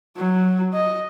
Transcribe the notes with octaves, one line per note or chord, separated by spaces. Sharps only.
F#3
D#5